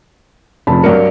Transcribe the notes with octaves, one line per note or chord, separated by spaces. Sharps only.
F1 C#3 F3 A5 B5
G2 F#3 A#4 D5 C#7